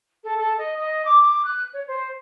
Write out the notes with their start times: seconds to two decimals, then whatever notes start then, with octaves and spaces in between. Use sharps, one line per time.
0.24 A4
0.37 A4
0.58 D#5
0.79 D#5
1.05 D6
1.22 D6
1.45 F#6
1.73 C#5
1.87 C5